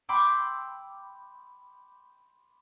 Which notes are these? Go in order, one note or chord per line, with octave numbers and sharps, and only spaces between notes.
G5 B5 C6 D6 E6